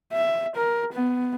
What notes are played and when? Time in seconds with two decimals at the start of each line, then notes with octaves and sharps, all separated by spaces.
0.13 E5
0.56 A#4
0.93 B3